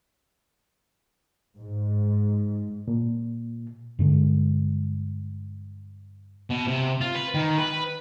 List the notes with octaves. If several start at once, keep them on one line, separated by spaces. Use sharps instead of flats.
G#2
A#2
G2 D3 G#3
B2
C3
F4
B4
D#3
B4